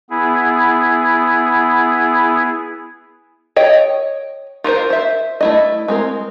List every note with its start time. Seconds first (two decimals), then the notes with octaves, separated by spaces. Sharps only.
0.10 B3 E4 G#4
3.56 C#5 D#5 G5
4.64 F4 F#4 A#4 C5
4.90 C5 E5
5.41 A3 E4 D#5
5.88 G#3 C4 A#4